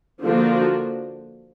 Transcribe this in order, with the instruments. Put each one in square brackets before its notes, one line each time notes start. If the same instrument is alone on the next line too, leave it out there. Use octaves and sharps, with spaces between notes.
[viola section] D3 F3 A#3 D4 F#4